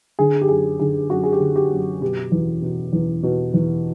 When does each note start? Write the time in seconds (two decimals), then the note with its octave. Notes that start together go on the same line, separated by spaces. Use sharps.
0.19 D3 G#4
0.41 G4
0.49 F#2 G#4
0.80 D3 G#4
1.10 F#2 F#4
1.23 G#4
1.33 G4
1.40 D3
1.56 G4
1.72 F#2
2.01 B2 G4
2.32 E2
2.62 B2
2.93 E2
3.23 B2
3.54 E2